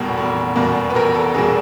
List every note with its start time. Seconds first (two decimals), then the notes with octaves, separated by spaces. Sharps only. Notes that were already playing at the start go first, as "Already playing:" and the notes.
Already playing: F1 E2 B2 G3 A#3
0.17 F1
0.56 E2 B2 G3 A#3
0.90 B4
0.95 F1 A#4
1.14 A4
1.34 E2 B2 G3 A#3 G#4